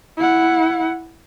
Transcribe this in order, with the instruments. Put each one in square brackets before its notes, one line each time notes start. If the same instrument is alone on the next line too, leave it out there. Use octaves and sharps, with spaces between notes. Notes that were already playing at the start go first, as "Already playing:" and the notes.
[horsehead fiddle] E4 F#5